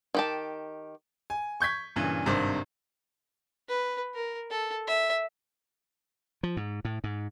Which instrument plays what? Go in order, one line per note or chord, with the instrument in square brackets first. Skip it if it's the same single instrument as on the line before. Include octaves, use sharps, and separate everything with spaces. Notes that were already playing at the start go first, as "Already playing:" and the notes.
[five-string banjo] D#3 G4 A5
[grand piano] G#5
C#6 G6 G#6 B6
G2 A#2 C#3 E3
G#1 G2 C3 D#3 C5
[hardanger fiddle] B4
A#4
A4
E5
[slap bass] F3
G#2
A2
G#2